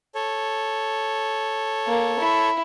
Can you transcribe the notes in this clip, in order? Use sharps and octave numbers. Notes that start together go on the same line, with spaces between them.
A4 C#5
A#3
E4